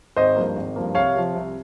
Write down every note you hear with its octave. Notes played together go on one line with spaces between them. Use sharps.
G#1 C5 D#5
G2 F3 A#3
G#1
G2 F3 A#3
C2 C#5 F5
C3 F3
C2